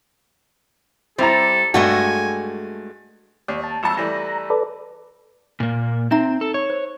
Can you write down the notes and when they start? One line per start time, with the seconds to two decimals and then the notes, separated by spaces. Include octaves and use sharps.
1.18 G3 C4 E4 A4 A#5
1.74 G2 G#3 A3 F#4 G#5
3.48 D#2 D5
3.63 A5
3.83 G#1 F2 A5 C#6 E6
3.97 E3 G3 A3 A#5
4.50 A4 B4 D5
5.60 A#2 A#3
6.11 C4 D#4 E5 A#5
6.41 A4
6.54 C#5
6.70 C5